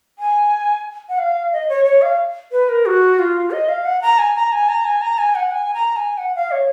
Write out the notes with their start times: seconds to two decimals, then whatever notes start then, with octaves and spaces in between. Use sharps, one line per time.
0.19 G#5
1.09 F#5
1.19 F5
1.53 D#5
1.69 C#5
1.85 C#5
2.02 F5
2.52 B4
2.69 A#4
2.86 F#4
3.19 F4
3.51 D#5
3.69 F5
3.85 F#5
4.02 A#5
4.19 G#5
4.36 A#5
4.52 G#5
4.69 A#5
4.85 G#5
5.01 A#5
5.18 G#5
5.35 F#5
5.52 G#5
5.74 A#5
5.96 G#5
6.18 F#5
6.35 F5
6.51 C#5